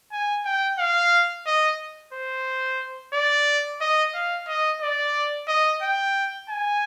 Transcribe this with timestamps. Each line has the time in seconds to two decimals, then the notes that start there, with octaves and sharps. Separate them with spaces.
0.12 G#5
0.45 G5
0.79 F5
1.46 D#5
2.13 C5
3.13 D5
3.81 D#5
4.14 F5
4.48 D#5
4.82 D5
5.48 D#5
5.82 G5
6.49 G#5